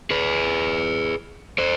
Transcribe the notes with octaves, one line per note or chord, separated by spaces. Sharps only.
G#4 B4
A4 C5